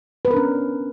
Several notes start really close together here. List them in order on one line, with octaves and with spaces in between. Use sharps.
B4 B3 A#4 D4 C#4